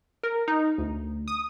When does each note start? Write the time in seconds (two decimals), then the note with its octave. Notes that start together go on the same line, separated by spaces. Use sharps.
0.23 A#4
0.48 D#4
0.78 D2
1.28 D#6